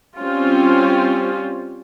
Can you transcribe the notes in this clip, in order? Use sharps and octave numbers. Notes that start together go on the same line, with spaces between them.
G3 C4 C#4 F4